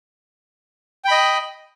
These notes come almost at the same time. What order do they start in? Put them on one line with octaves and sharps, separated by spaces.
G5 B5 D#5